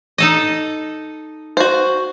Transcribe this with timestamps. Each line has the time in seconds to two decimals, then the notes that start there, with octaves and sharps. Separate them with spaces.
0.18 D#4 A4 D#5
1.57 F#4 C5